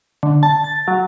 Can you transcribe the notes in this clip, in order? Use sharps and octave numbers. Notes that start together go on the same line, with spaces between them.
D3
A5
A6
F#3